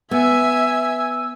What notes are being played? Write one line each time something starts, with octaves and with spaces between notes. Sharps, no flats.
B3 E5 G#5 E6